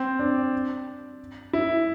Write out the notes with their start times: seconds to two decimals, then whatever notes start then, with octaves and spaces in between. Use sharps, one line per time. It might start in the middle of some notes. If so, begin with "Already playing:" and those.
Already playing: C4
0.19 D4
1.53 E4